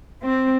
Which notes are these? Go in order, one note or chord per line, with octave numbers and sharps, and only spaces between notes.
C4